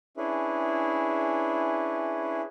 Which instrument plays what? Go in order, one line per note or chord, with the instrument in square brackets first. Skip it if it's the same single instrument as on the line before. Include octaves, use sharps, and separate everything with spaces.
[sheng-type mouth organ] C#4 D4 E4 G#4 B4